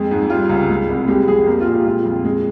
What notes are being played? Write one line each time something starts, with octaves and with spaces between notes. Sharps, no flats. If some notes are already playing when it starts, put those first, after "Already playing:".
Already playing: F2 G#3
G#2
G3 F4
C#2
G#3
C2
G#3 G4
F2 G#4
A#3 G4
F4
A#2
G4
G#3 F4
F2
G#3